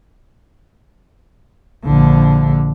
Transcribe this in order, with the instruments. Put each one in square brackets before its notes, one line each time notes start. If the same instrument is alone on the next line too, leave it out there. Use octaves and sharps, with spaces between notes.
[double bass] A#1 D3